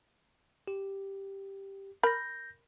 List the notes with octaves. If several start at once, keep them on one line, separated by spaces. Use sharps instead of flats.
G4
A#4 B5 G6 A#6